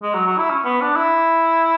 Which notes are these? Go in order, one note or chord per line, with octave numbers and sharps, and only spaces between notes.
G#3
F#3
F#3
E4
C#4
B3
D4
E4